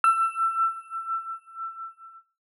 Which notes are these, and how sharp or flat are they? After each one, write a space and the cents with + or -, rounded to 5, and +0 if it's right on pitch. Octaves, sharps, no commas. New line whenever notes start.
E6 +25